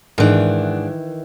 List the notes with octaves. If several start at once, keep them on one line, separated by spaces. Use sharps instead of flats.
G#2 D#3 E3 D4